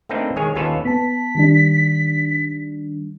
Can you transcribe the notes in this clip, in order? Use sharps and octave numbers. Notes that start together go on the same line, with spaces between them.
A3 A#3 C4 D4 D#4 B4
D#3 G#3 G#4 C#5 G#5
D#2 C#4 F4 A4 B4 C#5
B3 A5 B6
D#3 G3 D4